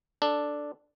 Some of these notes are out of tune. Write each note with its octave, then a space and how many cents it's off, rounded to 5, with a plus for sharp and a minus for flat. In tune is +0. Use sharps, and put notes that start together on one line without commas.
D4 +0 A4 +0